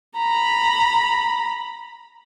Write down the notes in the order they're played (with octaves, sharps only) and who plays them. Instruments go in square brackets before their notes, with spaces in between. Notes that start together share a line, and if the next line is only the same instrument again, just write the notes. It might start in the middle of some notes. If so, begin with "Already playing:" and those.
[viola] A#5 B5